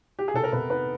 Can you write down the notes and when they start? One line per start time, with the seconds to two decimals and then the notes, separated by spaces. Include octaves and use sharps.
0.19 G4
0.28 G#4
0.34 C3 A4
0.44 A#4
0.52 C3 B3 B4
0.70 D#3 B3 B4